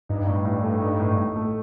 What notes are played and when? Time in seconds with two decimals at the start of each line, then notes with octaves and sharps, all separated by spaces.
0.09 G2 D#4
0.27 A2
0.45 A2
0.63 A3
0.81 D#4
1.00 A2
1.18 A2
1.36 A3